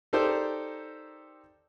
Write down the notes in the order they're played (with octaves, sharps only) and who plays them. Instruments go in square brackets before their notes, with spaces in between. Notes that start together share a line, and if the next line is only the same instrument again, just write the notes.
[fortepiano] D#4 G4 A4 A#4 C5 D5